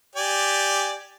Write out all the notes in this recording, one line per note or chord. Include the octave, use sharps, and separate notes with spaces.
G4 D5 G#5